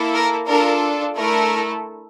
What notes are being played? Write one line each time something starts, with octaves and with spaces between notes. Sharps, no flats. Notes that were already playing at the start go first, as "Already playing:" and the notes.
Already playing: A#3 E4 A4
A#4
D4 F4 A4 A#4
A3 E4 A4 A#4